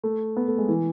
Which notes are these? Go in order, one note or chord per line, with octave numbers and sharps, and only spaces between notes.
A3
B3
A3
G#3
E3